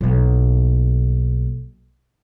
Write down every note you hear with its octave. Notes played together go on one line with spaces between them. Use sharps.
B1 A#3